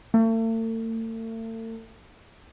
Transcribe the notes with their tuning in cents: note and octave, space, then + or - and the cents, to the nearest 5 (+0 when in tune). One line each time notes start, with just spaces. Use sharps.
A3 +40